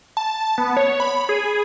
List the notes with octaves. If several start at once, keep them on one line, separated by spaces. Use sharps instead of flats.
A5
B3
C#5
B5
G#4